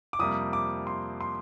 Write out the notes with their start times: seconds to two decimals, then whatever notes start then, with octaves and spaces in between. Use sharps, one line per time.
0.13 D6
0.19 F2 C3 G3 A#3 D#6
0.53 D6
0.87 C6
1.21 C6